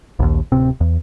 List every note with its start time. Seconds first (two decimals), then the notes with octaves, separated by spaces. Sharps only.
0.19 A#1 D#2
0.52 D1 C3 C4
0.81 E2